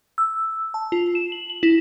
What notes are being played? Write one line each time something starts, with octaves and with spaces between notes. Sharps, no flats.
E6
A5
F4
E7
F#7
F#7
E4